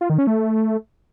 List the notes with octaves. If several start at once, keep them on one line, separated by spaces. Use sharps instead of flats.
F4
D#3
C#4
A3